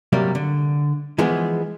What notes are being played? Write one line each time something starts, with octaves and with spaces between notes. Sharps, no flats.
C3 F#3 G3 A#3
D3
E3 F3 G#3 B3 G#4